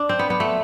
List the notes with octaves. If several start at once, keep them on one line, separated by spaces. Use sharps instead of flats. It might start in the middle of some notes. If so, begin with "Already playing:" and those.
Already playing: D4
C4
B3
B3
A3